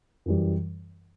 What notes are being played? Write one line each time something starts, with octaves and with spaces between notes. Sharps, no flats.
F#2 E3 G3